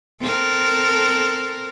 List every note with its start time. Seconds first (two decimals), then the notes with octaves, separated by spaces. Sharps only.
0.22 C4 A4 A#4